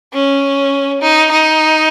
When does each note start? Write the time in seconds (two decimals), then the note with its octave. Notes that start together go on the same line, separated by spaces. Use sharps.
0.13 C#4
1.02 D#4
1.31 D#4